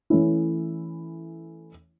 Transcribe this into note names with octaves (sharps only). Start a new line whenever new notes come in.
E3 A3 C#4 E4